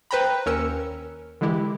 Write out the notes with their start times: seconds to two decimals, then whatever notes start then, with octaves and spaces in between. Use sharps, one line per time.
0.11 B4 C5 G5 A#5 B5
0.46 D#2 C#4 A#4 E6 C#7
1.41 D3 E3 G#3 E4 G4